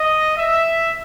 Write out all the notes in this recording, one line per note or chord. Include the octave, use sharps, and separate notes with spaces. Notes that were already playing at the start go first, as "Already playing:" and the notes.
Already playing: D#5
E5